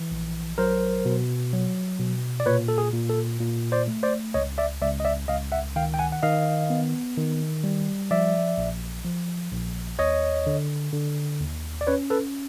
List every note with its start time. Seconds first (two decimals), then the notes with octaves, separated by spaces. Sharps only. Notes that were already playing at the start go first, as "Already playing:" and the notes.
Already playing: E3
0.11 A#1
0.58 F#3 A#4 C5
1.05 B2
1.53 F#3
1.99 B2
2.40 D5
2.46 A#2 B4 C#5
2.68 A4
2.78 G#4
2.93 A#2
3.09 A4
3.40 A#2
3.72 C5 D5
3.88 A3
4.03 C5 D5
4.34 C#2 C#5 D#5
4.58 D5 E5
4.82 C#2 D5 E5
5.00 D#5
5.05 D5 E5
5.28 C#2 D#5 F5
5.52 E5 F#5
5.76 D#3 F5 G5
5.94 G5
5.99 F#5 G#5
6.12 F#5
6.23 D#3 D#5 F5
6.70 B3
7.17 D#3
7.64 G3
8.11 F3 D5 E5
8.58 A#1
9.05 F3
9.52 A#1
9.99 D#2 C#5 D#5
10.46 D3
10.93 D3
11.41 D#2
11.81 D5
11.87 C#4 B4 C#5
12.10 A4 B4